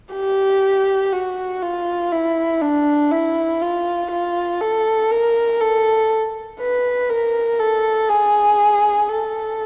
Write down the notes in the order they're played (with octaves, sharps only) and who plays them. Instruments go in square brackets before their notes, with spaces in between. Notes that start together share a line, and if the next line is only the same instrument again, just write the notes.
[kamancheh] G4
F#4
F4
E4
D4
E4
F4
F4
A4
A#4
A4
B4
A#4
A4
G#4
A4